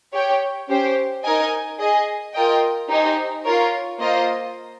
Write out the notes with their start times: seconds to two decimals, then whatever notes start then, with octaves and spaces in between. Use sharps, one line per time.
0.14 G4 C#5 G5
0.68 C#4 G4 C5
1.24 D#4 A#4 D#5 G#5
1.79 G#4 D#5 G#5
2.34 F4 A#4 D#5 G5
2.89 D#4 G4 C5 D#5 G#5
3.44 F4 A#4 C#5
4.00 A#3 F4 C5 D#5